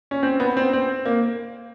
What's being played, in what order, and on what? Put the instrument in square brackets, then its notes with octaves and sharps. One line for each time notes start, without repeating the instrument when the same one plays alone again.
[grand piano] C#4
C4
B3
C4
C4
A#3